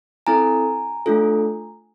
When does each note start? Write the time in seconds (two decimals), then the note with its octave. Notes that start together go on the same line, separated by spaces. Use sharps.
0.27 C4 E4 A4 G#5 A#5
1.06 A3 D4 F4 A4